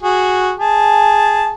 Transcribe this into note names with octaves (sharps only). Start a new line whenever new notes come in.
F#4 G#4
G#4 A5